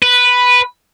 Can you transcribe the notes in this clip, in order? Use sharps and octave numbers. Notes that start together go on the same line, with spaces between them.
B4